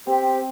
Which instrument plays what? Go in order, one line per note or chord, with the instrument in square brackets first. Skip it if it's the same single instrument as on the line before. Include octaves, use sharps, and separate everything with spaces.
[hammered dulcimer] C4 [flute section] G4 C5 G5